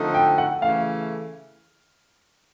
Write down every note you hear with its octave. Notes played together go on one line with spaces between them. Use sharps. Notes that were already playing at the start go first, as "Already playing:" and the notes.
Already playing: D3 F3 A3 C4 D#4
G5
F#5
C#3 E3 A3 F5